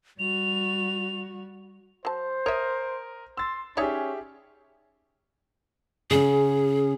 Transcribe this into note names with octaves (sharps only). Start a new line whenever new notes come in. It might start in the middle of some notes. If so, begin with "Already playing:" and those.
G3 F#4 F7
F#3 C5 A5
A#4 C#5 E5 D#6
C6 E6 A6
C#4 D#4 G4 G#4 C#5 D5 E5
C#3 C#4 G#4